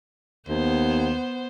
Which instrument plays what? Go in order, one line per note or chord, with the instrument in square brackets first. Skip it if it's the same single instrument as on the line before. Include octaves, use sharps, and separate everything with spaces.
[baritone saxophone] D#2 [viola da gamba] B3 C5